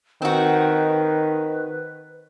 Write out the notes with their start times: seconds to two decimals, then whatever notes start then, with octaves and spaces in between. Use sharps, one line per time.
0.22 D#3 C4 F#4 B4